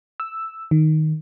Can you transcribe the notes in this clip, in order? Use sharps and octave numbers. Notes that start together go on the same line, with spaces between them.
E6
D#3